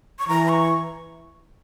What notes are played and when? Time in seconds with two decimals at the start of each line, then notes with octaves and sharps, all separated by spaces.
0.19 C#6
0.28 E3 A#5
0.48 C#6